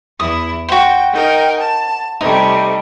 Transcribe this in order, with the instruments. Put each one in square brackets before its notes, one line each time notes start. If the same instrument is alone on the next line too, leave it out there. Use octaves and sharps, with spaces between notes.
[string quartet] E2 E4 [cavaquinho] D#6
[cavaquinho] F#4 C5 [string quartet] G5
[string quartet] D#4 A#4 G5
A5
[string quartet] C3 G3 A3 [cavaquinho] D#4